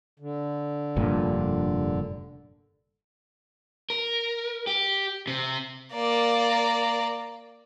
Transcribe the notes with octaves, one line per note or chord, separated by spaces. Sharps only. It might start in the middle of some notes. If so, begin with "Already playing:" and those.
D3
F1 G2 A#2
A#4
G4
C3
A#3 D5